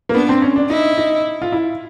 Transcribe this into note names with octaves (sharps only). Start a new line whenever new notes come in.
A#3
B3 D4
C4
C#4
D4
D#4 E4
D#4
F4
E4